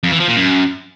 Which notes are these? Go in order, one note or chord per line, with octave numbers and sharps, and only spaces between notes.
F2
E3
F3
A#2
F#2